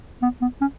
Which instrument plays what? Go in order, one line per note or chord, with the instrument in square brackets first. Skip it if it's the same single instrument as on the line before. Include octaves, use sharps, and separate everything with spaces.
[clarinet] B3
B3
C#4